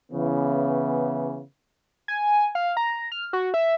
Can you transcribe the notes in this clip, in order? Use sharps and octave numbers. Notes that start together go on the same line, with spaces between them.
C#3 E3 B3
G#5
F5
A#5
F6
F#4
E5